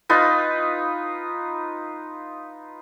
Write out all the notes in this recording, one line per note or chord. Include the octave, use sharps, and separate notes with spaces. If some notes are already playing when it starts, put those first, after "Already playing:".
D#4 F4 B4